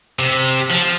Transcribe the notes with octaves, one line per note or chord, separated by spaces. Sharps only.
C3
F3